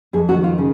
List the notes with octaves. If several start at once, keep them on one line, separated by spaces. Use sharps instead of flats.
F2 G#4
F#4
D#3
F4
C#3